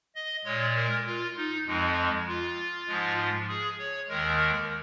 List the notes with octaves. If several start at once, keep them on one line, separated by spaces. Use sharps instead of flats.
D#5
A#2 G#3 C#5
A#4
F4
D#4
F2 F3 G#3
F4
G#2 F3 G#3
G#4
C#5
D#2 D#3 G#3 A#4